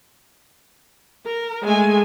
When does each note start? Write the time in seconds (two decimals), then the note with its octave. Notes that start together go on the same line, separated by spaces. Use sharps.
1.27 A#4
1.64 G#3 A3 G#5